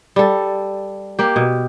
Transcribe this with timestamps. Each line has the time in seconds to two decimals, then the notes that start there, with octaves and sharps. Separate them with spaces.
0.16 G3 A4
1.19 A#3 G4
1.36 B2